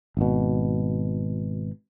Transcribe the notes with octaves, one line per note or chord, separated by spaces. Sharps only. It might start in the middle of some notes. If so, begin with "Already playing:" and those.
G#1 B2